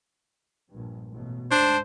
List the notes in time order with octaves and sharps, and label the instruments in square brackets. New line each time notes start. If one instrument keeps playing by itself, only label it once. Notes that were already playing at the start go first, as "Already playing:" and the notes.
[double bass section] A#1 G2
A1 B2
[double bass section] D2 G#2 [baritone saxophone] D4 [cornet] C5